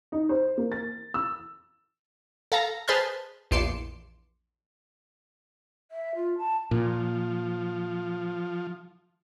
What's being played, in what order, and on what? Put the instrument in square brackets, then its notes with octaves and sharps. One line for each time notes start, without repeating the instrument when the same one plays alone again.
[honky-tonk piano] D#4
C5
A#3
A6
E6
[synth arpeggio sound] A4 F5 A#5
G#4 B4 C5 A5 C6 F6
A#1 E2 C6 D6 C#7 E7
[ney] E5
F4
A5
[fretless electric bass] A#2 [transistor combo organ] F3